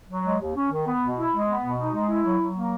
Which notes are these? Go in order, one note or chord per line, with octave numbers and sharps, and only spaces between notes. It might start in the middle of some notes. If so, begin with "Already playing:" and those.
F#3
G#3
D#2
C#4
D#3
B3
B2
E4
G#3
B3
B2
D#4
G#3
E4
F#3
F#3
A#3